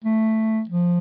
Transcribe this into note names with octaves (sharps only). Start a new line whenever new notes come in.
A3
F3